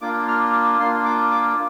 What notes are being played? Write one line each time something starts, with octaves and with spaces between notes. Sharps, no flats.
A#3 D4 F4 D6
F6
A#3 D4 F4 C6
D6
D6